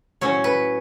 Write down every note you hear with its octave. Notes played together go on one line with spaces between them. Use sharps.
A2 F#3 C#4 C#5
B4